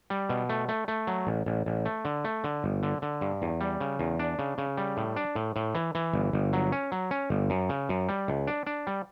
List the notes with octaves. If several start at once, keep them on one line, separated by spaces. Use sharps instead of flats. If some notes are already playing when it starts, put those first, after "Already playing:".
G3
B2
A3
A3
A3
F#3
A1
A1
A1
A3
D3
A3
D3
G1
D3
D3
G2
E2
G3
C#3
E2
D4
C#3
C#3
G3
A2
D4
A2
A2
E3
E3
G1
G1
F#3
C#4
F#3
C#4
G1
F#2
C#3
F#2
G3
C#2
D4
D4
G3